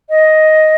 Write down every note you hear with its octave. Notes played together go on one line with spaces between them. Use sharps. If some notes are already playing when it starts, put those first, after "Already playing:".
D#5